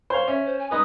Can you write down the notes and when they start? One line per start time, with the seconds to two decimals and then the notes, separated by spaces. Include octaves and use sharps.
0.10 C5 C#5 F5
0.28 C#4 E5
0.46 C5
0.59 G#5
0.71 G#3 D#4 B4 D#6